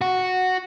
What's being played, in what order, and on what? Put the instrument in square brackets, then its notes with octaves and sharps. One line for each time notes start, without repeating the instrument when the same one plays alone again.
[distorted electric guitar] F#4